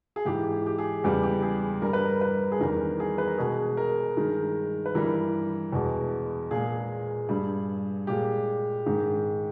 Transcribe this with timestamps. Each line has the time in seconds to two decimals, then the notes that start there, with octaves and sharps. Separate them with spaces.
0.16 G#4
0.25 G#2 E3 G#3 G4
0.66 G4
0.78 G#4
1.04 E2 C#3 G3 G4
1.23 G4
1.43 G#4
1.82 G2 G3 A#4
1.93 B4
2.05 A#4
2.21 B4
2.52 G#4
2.60 E2 D#3 G3 A#4
3.00 G#4
3.18 B4
3.27 A#4
3.38 B2 G#3 G#4
3.77 A#4
4.17 G2 D#3 G#3
4.86 B4
4.95 G2 E3 G3 A#4
5.72 E2 B2 G#3
6.51 A#2 G#3 G#4
7.29 G2 G3
8.07 A#2 G#3 G4
8.86 G#2 D#3 G#3